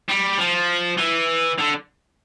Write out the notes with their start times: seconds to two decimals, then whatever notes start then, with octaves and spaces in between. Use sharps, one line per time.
0.09 G3
0.38 F3
0.98 E3
1.58 D3